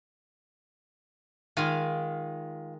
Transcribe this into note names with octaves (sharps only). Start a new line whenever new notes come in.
D#3 G#3 F4 F5 F6